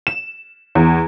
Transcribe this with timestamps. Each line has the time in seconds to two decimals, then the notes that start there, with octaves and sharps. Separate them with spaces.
0.07 E7
0.75 E2